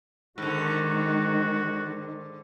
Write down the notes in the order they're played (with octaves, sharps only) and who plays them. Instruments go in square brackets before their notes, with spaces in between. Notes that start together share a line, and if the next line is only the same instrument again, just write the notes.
[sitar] G#2 D3 [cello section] D#3 G#3 [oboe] F#4